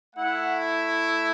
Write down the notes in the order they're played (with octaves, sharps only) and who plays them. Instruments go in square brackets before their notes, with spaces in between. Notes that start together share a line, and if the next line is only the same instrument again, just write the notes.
[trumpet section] A3 E4 F#5